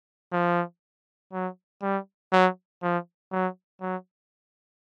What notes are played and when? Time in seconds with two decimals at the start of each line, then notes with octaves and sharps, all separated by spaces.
0.32 F3
1.33 F#3
1.82 G3
2.32 F#3
2.83 F3
3.32 F#3
3.81 F#3